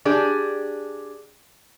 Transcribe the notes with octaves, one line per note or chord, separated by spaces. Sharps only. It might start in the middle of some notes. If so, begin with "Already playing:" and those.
D4 G4 G#4 D5